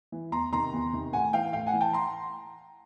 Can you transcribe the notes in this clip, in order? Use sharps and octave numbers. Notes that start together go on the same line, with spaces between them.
E3
E2 A#5 C6
C3 D#3 A#5 C6
E2
C3 D#3
A2 F#5 G#5
E3 F5 G5
A2 F5 G5
F#5 G#5
E3
G5 A5
A#5 C6